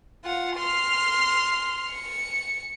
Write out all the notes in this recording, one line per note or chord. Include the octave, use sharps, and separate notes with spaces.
F4 F#5
C6 F6
C#7